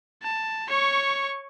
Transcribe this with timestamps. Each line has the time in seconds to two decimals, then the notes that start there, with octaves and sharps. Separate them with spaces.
0.23 A5
0.68 C#5 C#6